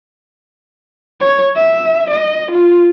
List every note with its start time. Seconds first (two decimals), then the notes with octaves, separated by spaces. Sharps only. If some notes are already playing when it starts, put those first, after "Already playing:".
1.20 C#5
1.56 E5
2.11 D#5
2.52 F4